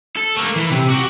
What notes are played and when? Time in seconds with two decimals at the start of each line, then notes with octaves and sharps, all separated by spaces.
0.17 A4
0.37 A3 A#3
0.56 E3
0.71 C3
0.90 F#4 G4